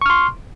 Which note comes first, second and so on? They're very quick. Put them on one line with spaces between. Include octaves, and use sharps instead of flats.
C#6 F6 C6